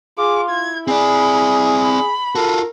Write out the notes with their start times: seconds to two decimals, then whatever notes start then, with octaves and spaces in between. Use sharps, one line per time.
0.18 F4 G#4 D6
0.50 E4 G#6
0.88 C4 G#4 D5 B5
1.81 B5
2.35 F4 F#4 A4 A#4